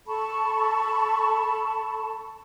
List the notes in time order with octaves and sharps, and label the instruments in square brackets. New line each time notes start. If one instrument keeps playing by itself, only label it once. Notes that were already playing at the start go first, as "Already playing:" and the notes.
[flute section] A4 A5 B5 C#6